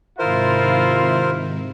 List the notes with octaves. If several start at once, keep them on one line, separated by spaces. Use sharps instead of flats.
G#2 C3 D#3 E4 F4 A#4 C5